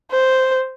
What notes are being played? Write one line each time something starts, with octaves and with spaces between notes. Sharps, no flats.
C5